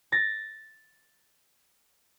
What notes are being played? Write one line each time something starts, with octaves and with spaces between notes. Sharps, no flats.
A6 A#6